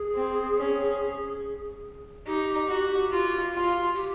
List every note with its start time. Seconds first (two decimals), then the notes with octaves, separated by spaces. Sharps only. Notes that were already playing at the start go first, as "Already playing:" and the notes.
Already playing: G#4
0.15 C4
0.58 C#4
2.26 D#4 G4
2.69 F#4
3.11 F4
3.54 F4
3.95 G4